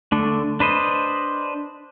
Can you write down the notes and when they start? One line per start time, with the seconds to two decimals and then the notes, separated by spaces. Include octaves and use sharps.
0.12 D3 A3 D4
0.60 D4 B4 C5 D#5